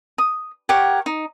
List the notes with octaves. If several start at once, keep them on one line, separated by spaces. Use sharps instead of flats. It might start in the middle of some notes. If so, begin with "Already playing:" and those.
D#6
G4 A#4 C#5 F#5
D#4